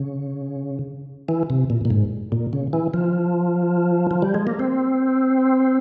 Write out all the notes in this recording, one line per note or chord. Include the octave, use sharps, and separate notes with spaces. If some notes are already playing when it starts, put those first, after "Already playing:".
Already playing: C#3
E3
C3
A#2
A#2
G#2
A#2
C#3
E3
F3
F3
G3
G#3
A#3
C4